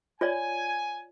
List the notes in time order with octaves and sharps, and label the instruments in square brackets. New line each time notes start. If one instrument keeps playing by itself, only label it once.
[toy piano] F4 C#5 D5 [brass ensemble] G#5